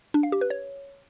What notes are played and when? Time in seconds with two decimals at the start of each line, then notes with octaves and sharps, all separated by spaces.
0.14 D4
0.23 F5
0.32 G4
0.41 B4
0.50 C#5